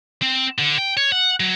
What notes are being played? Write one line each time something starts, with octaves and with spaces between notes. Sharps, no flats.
C4
D3
G5
C#5
F#5
F#3